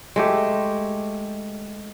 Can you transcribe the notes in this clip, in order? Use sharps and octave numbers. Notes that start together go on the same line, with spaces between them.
G#3 A3 G4